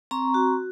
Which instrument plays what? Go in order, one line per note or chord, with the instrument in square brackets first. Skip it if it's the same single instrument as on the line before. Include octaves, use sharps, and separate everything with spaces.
[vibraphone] C4 A#5 C#6
F#4